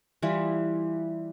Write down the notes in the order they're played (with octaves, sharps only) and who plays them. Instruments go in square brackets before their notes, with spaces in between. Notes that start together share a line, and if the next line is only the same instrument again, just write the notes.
[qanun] E3 G3 E4 F4